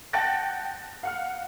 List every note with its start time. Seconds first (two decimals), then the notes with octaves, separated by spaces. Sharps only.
0.13 F#5 G5 A5 F#6 A6 A#6
1.03 F5 F#5 F6